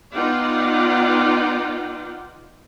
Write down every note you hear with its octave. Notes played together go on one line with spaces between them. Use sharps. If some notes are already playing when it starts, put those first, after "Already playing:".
B3 D#4 F4 D5 F#5 G5